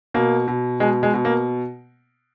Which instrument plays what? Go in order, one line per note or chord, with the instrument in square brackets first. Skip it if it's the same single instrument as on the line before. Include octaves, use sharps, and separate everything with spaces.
[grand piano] B2 A#3
B2
B2 G#3
G#3
B2
A#3